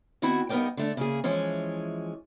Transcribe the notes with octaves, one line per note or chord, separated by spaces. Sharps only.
D#3 B3 C4 E4 F#4
G2 B3 D#4 A#4 D5 G5
D3 A3 D4
C#3 A#3 G#4
E3 F3 G#3 C#4